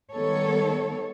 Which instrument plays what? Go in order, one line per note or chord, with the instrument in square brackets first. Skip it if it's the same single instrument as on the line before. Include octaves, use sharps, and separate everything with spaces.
[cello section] D#3 G3 G#3 B3 A4 C#5